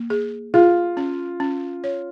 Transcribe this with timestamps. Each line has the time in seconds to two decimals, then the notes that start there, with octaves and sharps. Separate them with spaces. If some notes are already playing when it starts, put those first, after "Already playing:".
Already playing: A#3
0.10 G#4
0.54 F4 G#4
0.97 C#4
1.40 C#4
1.84 C#5